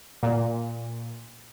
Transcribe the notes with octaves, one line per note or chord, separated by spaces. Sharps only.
A#2